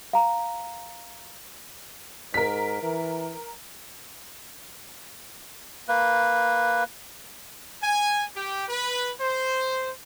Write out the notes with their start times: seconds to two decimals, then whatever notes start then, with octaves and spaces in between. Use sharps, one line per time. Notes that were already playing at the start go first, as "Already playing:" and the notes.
0.13 F5 A#5
2.34 G#2 A#4 B6
2.83 E3
5.88 A#3 B4
7.83 G#5
8.36 G4
8.68 B4
9.21 C5